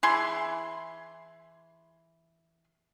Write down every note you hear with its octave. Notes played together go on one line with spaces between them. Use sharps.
E3 G#4 C6